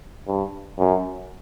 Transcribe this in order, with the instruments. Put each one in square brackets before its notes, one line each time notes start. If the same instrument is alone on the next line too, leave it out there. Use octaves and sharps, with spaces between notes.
[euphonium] G2
F#2